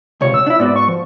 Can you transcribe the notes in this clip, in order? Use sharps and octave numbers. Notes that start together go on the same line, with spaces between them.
C#2 C3 C#5
E6
D4 E4
G#2 B3 F#4 D5
C#6
F3